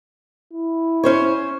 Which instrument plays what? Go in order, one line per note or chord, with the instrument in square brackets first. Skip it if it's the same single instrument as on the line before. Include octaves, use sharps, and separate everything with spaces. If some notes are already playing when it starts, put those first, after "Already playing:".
[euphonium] E4
[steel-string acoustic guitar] C#4 C5 C#5